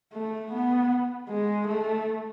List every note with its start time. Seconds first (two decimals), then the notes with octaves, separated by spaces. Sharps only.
0.14 A3
0.52 B3
1.29 G#3
1.67 A3